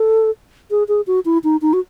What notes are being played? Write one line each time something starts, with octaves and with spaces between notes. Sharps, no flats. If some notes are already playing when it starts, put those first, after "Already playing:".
Already playing: A4
G#4
G#4
F#4
E4
D#4
D#4
F#4